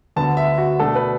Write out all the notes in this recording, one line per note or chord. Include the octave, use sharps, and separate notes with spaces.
D2 D3 B3 A5
E5
F#4
B2 A3 D4 A4
B4